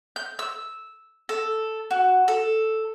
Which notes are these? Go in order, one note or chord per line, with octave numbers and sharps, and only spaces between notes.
G6
E6
A4
F#4
A4